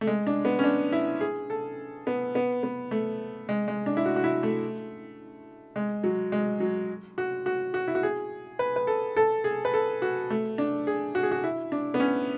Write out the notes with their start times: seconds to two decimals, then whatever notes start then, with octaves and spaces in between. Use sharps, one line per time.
0.01 A3
0.07 G#3
0.27 D4
0.45 B3
0.59 C#4
0.64 D4
0.92 E4
1.21 G#4
1.50 A4
2.07 B3
2.35 B3
2.63 B3
2.91 A3
3.49 G#3
3.68 G#3
3.86 D4
3.97 E4
4.05 F#4
4.16 F#4
4.24 E4
4.43 A3
5.76 G#3
6.04 F#3
6.32 G#3
6.60 F#3
7.18 F#4
7.46 F#4
7.74 F#4
7.88 E4
7.95 F#4
8.03 G#4
8.59 B4
8.76 B4
8.87 A4
9.17 A4
9.44 G#4
9.65 B4
9.74 A4
10.02 F#4
10.30 A3
10.58 D4
10.87 G#4
11.15 F#4
11.23 G#4
11.31 F#4
11.44 E4
11.72 D4
11.94 B3
12.00 C#4